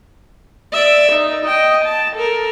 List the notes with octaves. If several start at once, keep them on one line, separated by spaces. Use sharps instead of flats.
D5 E5
D#4
D#5 G5
A5
A4 A#4